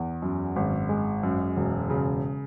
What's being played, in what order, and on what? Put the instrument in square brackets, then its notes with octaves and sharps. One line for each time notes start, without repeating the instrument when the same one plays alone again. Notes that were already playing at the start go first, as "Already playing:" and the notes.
Already playing: [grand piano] E2
F#2
G#1
G#3
F#2
E1
C#3